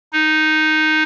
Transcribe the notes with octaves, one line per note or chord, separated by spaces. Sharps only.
D#4